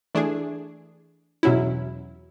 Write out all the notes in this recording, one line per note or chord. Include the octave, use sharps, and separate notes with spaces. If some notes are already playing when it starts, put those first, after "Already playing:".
E3 A3 D4 G#4
E2 B2 F#3 C#4 E4